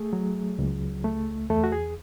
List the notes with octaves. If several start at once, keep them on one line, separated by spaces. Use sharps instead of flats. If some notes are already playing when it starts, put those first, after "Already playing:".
Already playing: A3 G#4
F#3
C#2
A3
E2 A3 A4
F#4
G#4